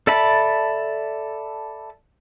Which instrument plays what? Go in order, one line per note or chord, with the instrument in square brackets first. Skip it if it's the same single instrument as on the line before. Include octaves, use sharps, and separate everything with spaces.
[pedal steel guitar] A4 D5 E5 A5 B5